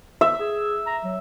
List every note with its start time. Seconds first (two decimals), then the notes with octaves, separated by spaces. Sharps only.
0.21 E5
0.40 G#4
0.87 A#5
1.03 F#3